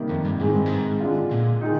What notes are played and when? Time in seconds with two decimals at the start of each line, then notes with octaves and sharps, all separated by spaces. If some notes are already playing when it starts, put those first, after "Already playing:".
Already playing: C3 D#3 G3 A#3
0.09 F2
0.25 G2
0.40 G#2 D#3 G#3 C4
0.53 G2
0.66 G#2
1.00 D3 G#3 D4 F4
1.31 A#2
1.61 D#3 G#3 D#4